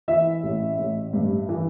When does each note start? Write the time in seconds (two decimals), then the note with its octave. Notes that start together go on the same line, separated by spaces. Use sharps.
0.08 E3 E5
0.43 A1
0.78 A1
1.13 G2
1.49 E3